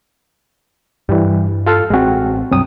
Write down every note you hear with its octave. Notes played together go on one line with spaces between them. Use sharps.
G2 E3 G3
F4 A4 F5
A1 G#3 C4 F#4
C2 G2 F#3 C4 D#6